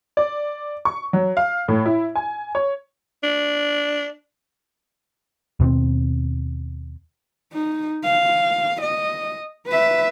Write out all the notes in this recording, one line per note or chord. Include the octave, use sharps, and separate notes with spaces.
D5
C#6
F#3
F5
A2
E4
G#5
C#5
D4
D#2 B2 A3 C4
D#4
F5
D#5
B4 E5